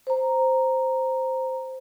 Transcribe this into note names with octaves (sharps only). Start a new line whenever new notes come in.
C5 A#5